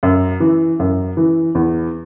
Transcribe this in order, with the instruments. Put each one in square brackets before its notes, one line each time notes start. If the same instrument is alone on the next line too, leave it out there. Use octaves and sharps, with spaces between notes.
[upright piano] F#2
E3
F#2
E3
E2